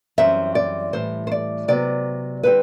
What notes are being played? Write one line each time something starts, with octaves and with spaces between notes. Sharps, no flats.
F#2 E3 G3 C4 E5
D5
A2 E3 G3 C5
C5
D5
C3 F#3 B3 D5
D3 G3 C4 B4